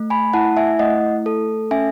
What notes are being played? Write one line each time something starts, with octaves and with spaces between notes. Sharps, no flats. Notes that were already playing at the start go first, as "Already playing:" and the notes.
Already playing: A3
G#5 B5
E4 F#5 A5
E5 G#5
A3 D#5 F#5
A4
C#4 E5 G#5